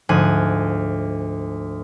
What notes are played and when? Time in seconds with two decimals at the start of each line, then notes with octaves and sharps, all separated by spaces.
0.09 D2 G#2 F3 G#5 F#6